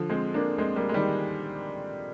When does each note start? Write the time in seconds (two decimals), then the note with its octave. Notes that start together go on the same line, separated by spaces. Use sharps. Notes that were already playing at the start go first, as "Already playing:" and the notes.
Already playing: D3 F3
0.10 G#3 C4
0.34 A#3 D4
0.58 G#3 C4
0.76 G3 A#3
0.89 G#3
0.94 D#3 G3